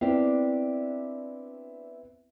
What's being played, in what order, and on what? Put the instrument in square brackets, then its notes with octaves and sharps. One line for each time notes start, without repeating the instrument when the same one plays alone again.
[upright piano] B3 C4 E4 [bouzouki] D4 G4 F5